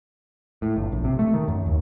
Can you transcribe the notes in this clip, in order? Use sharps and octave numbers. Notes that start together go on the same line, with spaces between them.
A2
G1
A#1
C3
A3
D#3
F#2
D#2